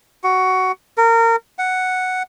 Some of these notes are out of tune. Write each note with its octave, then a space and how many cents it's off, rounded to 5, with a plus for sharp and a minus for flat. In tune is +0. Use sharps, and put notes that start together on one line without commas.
F#4 +10
A#4 -25
F#5 +0